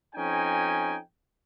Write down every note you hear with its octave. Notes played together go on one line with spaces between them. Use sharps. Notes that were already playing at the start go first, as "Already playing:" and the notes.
F2 C#4 D#4 G5 G#5